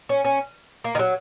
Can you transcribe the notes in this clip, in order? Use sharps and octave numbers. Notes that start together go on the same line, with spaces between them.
C#4
C#4
A#3
D#3
F#3